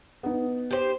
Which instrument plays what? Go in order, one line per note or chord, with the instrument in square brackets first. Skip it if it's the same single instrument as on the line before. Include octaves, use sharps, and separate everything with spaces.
[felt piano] B3 D#4
[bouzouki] G4 C5